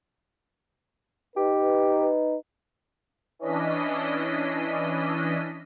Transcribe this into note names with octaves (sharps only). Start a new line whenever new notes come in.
D#4 G4 B4
E3 C#4 D4 D#5 B6